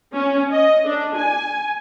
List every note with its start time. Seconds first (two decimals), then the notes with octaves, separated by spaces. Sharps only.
0.13 C#4
0.52 D#5
0.87 D4
1.18 G#5